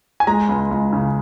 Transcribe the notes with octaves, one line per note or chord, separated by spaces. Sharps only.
G#5
G#3 A#5
C#2
C#2
C#3